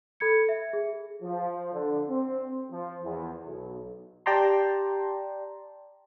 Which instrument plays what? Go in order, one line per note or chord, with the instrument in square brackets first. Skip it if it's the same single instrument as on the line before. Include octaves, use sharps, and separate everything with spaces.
[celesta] A4 B5 G#6 C#7
E5
G#4
[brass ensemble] F3
D3
C4
F3
E2
B1
[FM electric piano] G4 D5 G5 A5 A#5 C6